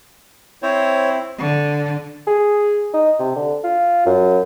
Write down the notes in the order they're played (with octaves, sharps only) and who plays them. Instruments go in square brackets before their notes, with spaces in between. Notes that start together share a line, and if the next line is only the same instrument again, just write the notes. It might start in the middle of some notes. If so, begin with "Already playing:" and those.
[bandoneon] C4 E4 [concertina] C5 C#5
[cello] D3
[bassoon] G#4
D#4
C3
D3
F4
F#2